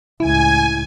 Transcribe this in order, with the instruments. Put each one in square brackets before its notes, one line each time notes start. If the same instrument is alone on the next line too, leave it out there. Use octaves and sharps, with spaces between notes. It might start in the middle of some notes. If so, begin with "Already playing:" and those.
[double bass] C#2 A2 [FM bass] E4 [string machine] G#5